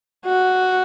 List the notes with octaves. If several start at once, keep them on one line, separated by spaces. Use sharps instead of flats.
F#4